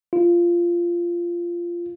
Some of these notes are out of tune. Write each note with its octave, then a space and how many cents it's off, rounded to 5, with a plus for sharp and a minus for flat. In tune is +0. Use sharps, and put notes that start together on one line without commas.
F4 -15